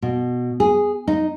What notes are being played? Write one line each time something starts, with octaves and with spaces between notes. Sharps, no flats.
B2
G#4
D#4